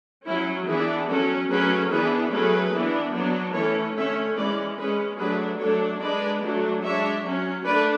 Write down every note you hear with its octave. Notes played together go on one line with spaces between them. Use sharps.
F#3 C#4 E4
E3 B3 D4 E4 G#4
F#3 C#4 F#4 A4
F#3 A3 C#4 G#4 B4
E3 B3 D4 G#4 B4
F#3 A3 C#4 G#4 B4
E3 B3 D4
F#3 B3 D4
E3 A3 C#4 A4 C#5
D3 A3 C#4 C#5 E5
E3 G#3 C#4 B4 D5
G#3 C#4 G#4 B4
F#3 A3 D4 G#4 B4
F#3 A3 D4 A4 C#5
G#3 D4 B4 D5
F#3 A3 D4
G#3 D4 C#5 E5
F#3 C#4
A3 D4 B4 D5